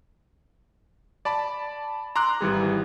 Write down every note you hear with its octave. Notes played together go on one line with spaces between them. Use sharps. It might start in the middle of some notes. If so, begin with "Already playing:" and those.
D5 A5 B5
A#5 C6 D6 E6 F#6
G#1 E3 G3 G#4